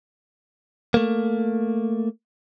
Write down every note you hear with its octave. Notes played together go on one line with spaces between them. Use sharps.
A3 A#3